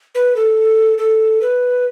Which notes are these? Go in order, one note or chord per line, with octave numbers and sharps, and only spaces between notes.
B4
A4
A4
B4